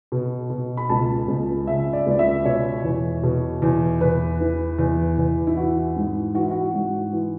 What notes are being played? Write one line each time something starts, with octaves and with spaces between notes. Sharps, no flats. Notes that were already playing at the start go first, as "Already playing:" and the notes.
B2
B2
B5
C#2 A5
C#2
C#3 E5
D5
C#2 D5
E5
B2 C#5
E2
B2
E2
E2 B4
E3
E2
E2
E4
E3 F#4
G#2
E3 F#4
E4
F#4
G#2
E3